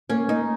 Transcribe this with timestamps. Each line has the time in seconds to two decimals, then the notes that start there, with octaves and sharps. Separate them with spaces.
0.10 A#3 C#4
0.28 A#3 D#4